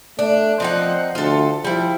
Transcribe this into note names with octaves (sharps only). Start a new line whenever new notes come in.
A3 D4
F3 C4 D#4 F#5
D2 F4 A4
F3 G3 E4